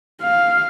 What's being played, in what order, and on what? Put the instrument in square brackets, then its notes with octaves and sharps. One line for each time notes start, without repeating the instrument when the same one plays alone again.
[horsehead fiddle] F5